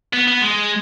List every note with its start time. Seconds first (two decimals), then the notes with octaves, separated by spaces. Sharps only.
0.13 B3
0.27 B3
0.42 G#3